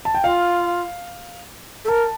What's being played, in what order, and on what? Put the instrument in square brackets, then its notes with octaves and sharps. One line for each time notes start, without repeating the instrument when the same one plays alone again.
[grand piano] A5
G5
[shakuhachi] F4 [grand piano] F5
[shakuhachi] A4
[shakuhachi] A#4 [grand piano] A5